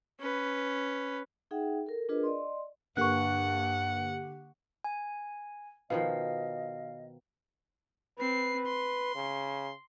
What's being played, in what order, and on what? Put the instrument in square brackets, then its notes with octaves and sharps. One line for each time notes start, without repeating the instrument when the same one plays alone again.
[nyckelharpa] C#4 B4
[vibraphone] D#4 G#4 E5 F#5 G5
A4 A#4
D4 F4 G#4 A#4 B4 D#5
D5 D#5 C6
[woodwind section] G2 [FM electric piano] D3 A#3 G4 [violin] F#5 [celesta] C#6 F#6
[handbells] G#5
[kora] B2 D#3 F3 [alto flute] D#5 [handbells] F5
[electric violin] C4 C7 [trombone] B4
[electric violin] C6
[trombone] C#3